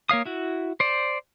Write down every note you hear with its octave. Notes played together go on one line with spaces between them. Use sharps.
A#3 C#5 F5 D#6
E4 F#4
C5 D5